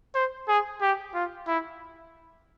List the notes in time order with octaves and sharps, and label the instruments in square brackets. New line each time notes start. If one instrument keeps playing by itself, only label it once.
[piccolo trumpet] C5
G#4
G4
F4
E4